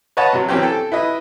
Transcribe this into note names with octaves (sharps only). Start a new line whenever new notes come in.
B4 C#5 D#5 F#5 A5
C3 F#3
E3 F#3 C4 C#4 G4
A4 G5
E4 B4 D#5